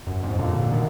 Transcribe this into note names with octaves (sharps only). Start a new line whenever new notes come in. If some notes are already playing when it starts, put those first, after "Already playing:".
F#2
F2 G#2
A#2 D3
B2 D#3